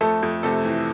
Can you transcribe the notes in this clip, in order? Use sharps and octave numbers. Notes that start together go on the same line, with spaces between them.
F2 A3 A4
F2
C3 A3 A4
E3